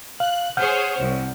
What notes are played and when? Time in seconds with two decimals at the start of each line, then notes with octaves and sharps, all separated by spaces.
0.20 F5 F#6
0.57 G#4 C5 C#5 F#5 F6 G6
0.98 C2